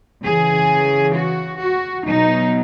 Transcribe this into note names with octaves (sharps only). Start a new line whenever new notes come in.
C#3 E3 G#4
F#4
F#4
B2 F#3 D#4